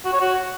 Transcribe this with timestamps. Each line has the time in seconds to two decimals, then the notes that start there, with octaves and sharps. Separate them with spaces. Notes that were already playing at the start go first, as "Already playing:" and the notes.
0.05 F#4
0.13 C#5
0.21 F#4